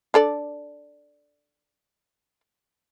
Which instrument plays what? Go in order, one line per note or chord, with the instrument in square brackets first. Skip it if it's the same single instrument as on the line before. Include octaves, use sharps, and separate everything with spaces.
[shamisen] D4 A4 D5